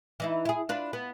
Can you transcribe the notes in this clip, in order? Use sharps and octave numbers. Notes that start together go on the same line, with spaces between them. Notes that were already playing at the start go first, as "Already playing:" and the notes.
E3 D#4 E4
E4 G#4
D4 F4 B4
B3